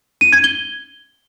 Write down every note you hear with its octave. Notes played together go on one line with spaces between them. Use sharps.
D#7
G#6
G7